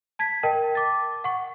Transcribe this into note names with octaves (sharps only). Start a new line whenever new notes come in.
A5 G#6 B6
A#4 D#5 G5 A5
D6 A6
F#5 C#6